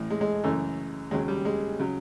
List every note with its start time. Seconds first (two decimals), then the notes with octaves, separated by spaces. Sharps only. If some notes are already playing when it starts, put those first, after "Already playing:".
Already playing: A1 A2 E3
0.10 G#3
0.21 G#3
0.43 F#2 C#3 E3 A3
1.11 D#2 C#3 F#3 G#3
1.28 G3
1.45 G#3
1.79 C#3 F#3